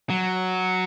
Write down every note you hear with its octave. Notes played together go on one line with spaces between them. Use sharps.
F#3